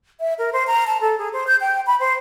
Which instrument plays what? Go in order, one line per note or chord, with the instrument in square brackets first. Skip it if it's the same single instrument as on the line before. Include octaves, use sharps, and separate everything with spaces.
[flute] E5
A#4
C5
A#5
A5
A4
G#4
C5
G6
G5
B5
C5